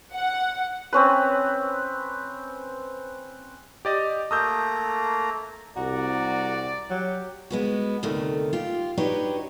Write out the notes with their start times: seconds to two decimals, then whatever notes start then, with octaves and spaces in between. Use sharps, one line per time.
0.14 F#5
0.93 C4 C#4 B4
3.85 G4 D5 D#5
4.31 A3 A#3 A#5 D#6 E6 G6
5.76 C2 F#4 D5 A#5
6.90 F#3 G4
7.50 G#3 B3 F#4
8.03 D2 C3 D#3 A3
8.53 F4 G4
8.97 D4 D#4 F#4 G4 B4 C#5